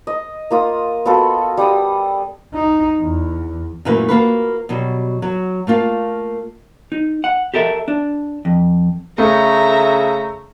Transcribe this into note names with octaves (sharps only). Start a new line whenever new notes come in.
D#5
A#3 F4 D#6
B3 F4 F#4 A4
G3 F#5 D#6
D#4
E2
F#2 A#2 E3 A3 A#3 B4
A#3 F4 F#4 A#4 B4
B2 F#3 G3
F#3
A3 A#3 F4 F5
D#4
F#5
G4 A4 A#4 D#5 E5
D4
F2
C#3 A3 E5 A#5